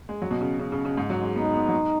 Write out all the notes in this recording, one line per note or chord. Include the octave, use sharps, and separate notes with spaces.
G#3
F#3
B2
C#3
C#3
C#3
C#3
G#2
F#3
G#3
B3 D#4
G#3
B3
F#3
G#3